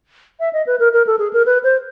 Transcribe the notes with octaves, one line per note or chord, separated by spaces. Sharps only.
E5
D#5
B4
A#4
A#4
A4
G#4
A#4
B4
C5